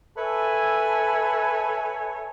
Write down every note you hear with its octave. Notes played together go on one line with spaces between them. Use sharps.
A4 B4 C#5 E5 G#5 A5